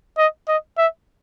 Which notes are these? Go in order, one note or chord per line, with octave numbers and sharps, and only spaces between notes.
D#5
D#5
E5